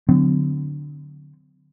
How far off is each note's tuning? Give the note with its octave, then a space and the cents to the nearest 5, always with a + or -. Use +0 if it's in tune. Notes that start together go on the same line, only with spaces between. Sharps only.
D3 +0 F#3 -25 C4 -45